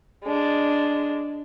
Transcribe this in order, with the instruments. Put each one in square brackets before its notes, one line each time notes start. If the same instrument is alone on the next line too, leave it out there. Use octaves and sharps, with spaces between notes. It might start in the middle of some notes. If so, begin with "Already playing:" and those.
[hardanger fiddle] G#3 D4